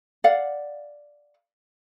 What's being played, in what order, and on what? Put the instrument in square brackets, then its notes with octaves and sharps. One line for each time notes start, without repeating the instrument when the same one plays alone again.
[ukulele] D5 F5 F#5